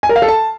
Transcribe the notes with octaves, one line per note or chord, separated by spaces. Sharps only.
G#5
A#4
F5
A4
A5